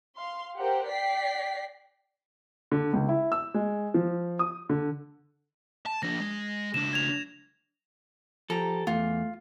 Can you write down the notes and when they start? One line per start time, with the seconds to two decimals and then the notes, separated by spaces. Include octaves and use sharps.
0.16 F5 C6
0.58 G4 A#4 C5 F#5
0.87 D5 G5 B6 C7
2.71 D3
2.93 C#2
3.09 E4
3.32 E6
3.54 G#3
3.94 F3
4.39 D#6
4.69 D3
5.86 A5
6.03 F3 D4 A#6
6.21 G#3
6.74 C#2 D4 E7
6.93 G#6 F7
8.50 F3 G4 A4 A#5
8.87 E2 A3 F4